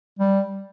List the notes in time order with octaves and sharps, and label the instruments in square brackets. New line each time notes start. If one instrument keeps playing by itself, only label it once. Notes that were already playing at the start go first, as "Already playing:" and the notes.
[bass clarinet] G3